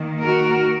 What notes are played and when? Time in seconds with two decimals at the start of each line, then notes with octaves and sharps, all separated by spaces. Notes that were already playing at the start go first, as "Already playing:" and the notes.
Already playing: D#3 A#3
0.23 F#4 A#4